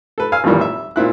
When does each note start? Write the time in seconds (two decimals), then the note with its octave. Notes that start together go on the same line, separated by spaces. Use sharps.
0.18 A4 B4
0.32 F5 G#5 E6
0.44 G#1 F2 A#2 E3 G3
0.61 E5
0.96 A#2 C4 E4 F#6